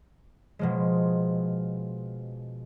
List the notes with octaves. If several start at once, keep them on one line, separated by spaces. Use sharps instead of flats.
B2 F3 G#3